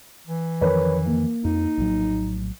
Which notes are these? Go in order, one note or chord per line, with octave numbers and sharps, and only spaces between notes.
E3
F2 D#3 F3 A#4 B4 C#5
A#3
F2 D#4
A#1 A2 F#3